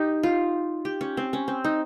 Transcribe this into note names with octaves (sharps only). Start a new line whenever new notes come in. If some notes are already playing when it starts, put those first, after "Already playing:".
Already playing: D#4 G4
F4
G4
C#4
C4
C#4
C4
D#4